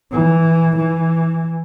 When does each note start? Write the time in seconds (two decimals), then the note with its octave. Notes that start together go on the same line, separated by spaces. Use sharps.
0.12 E3
0.77 E3